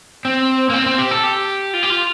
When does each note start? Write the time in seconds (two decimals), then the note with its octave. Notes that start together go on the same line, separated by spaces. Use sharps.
0.25 C4
0.70 A#3
0.74 C4
0.86 C4
0.98 G4
1.11 A4
1.24 G4
1.74 F4
1.83 G4
1.90 F4